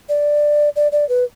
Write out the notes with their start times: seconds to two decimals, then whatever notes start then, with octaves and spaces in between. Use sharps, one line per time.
0.09 D5
0.76 D5
0.92 D5
1.09 B4